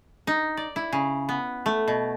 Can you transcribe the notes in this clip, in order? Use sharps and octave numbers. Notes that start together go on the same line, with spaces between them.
D#4
D5
E4
C#3
B3
A3
B2